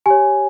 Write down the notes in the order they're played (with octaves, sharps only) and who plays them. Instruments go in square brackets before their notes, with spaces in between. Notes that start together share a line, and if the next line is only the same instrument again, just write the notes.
[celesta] G4 C#5 G#5